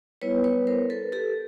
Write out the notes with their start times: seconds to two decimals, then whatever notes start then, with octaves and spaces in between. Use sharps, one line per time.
0.22 G3 B3 E4 B4 C#5
0.44 B4 C#5
0.67 A#4 C5
0.90 A4 B4
1.12 G4 A4